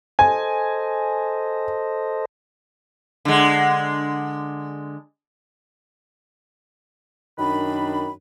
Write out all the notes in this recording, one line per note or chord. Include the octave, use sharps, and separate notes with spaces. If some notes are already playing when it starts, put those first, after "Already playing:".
A4 C5 D#5 G#5
D3 G#3
F#2 D#3 D4 B5